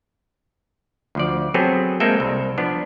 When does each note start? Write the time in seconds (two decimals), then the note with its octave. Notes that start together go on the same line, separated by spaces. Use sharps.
1.15 D2 F3 D5
1.54 F#3 B3 C4 G#4 A4
2.00 G#3 A#3 C4 A4 E5 G5
2.20 C2
2.58 F3 B3 D4